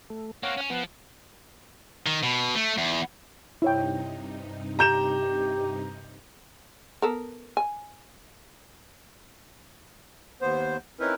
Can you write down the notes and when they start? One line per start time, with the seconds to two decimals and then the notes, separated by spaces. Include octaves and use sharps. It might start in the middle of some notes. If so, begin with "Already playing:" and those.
0.10 A3
0.43 A#3 C4 C#5 F5 F#5
0.57 C#4
0.70 F3 B3 F#5
2.06 D#3
2.23 B2
2.55 A3
2.78 E2
3.62 G2 C3 D#4 E4 C#5 G5
4.79 G4 A#5 G6 E7
7.02 B3 A4 A#4
7.57 G#5
10.41 D#2 B3 C5
11.00 C4 C#4 D#4 E4 A#4 B4